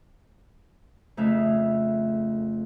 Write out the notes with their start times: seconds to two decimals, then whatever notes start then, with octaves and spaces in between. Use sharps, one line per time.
1.17 F2 C#3 A3 E5 F5